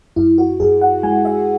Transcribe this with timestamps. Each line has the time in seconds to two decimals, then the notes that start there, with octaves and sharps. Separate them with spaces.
0.16 F#2 E4
0.38 F#4
0.60 F#2 G#4
0.81 F#5
1.03 G#3 G#5
1.25 E5